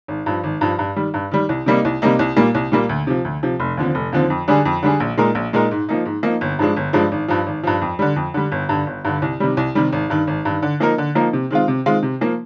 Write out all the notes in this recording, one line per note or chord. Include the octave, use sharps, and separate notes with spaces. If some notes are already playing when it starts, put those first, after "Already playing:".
G#1
G2 F3
G#1
G2 F3
G2
D#3 G3
G2
D#3 G3
C2
C3 G3 A#3 D#4
C2
C3 G3 A#3 D#4
C2
A#2 G3 A#3
C2
A#2 G3 A#3
D2
C3 F3
D2
C3 F3
F1
D#2 D3 F3 C4
F1
D#2 D3 F3 C4
F2
D3 G3 D4 G#4
F2
D3 G3 D4 G#4
A#1
A#2 G#3 D#4 A#4
A#1
A#2 G#3 D#4 A#4
G#2
F3 A#3 D#4
G#2
F3 A#3 D#4
G1
G2 F3 G#3 D4
G1
G2 F3 G#3 D4
G#1
G2 F3
G#1
G2 F3
F2
D3 G3
F2
D3 G3
G1
G2 D3
G1
G2 D3
C2
C3 D#3 G3
C2
C3 D#3 G3
G#1
G2 D#3
G#1
G2 D#3
D3
F3 A#3 D#4 A#4
D3
F3 A#3 D#4 A#4
C3
D#3 G#3 C4 F4
C3
D#3 G#3 C4 F4
C3
F3 A#3